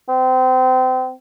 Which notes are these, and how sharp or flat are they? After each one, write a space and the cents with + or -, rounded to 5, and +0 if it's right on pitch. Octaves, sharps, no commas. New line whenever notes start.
C4 -30